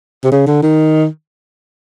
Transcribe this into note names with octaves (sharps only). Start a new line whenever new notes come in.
C3
C#3
D3
D#3